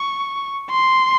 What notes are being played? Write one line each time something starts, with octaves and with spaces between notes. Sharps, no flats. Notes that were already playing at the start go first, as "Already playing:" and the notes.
Already playing: C#6
C6